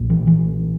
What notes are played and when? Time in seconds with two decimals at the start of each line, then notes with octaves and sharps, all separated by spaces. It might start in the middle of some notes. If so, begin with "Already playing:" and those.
Already playing: B1 A#2
0.10 E3
0.27 E3